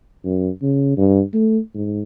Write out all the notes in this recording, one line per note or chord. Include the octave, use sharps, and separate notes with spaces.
F#2
C#3
G2
A3
G#2